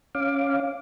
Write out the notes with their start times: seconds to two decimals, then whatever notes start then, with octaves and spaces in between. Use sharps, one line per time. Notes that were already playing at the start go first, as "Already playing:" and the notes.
0.15 C#4 F5 D6